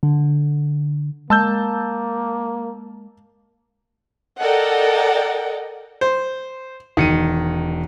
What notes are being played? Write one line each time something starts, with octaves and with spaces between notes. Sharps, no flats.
D3
G#3 A#3 A5 E6 G6
A4 A#4 D5 D#5 F#5 G5
C5
E1 D#3 C#7 D#7